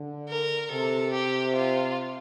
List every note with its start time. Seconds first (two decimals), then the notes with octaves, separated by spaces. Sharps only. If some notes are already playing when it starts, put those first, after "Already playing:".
Already playing: D3
0.29 A#4
0.70 C3 A4
1.13 G4
1.55 F4